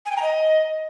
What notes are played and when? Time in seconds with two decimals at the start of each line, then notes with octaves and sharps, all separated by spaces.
0.06 G#5
0.11 G5
0.17 A#5
0.22 D#5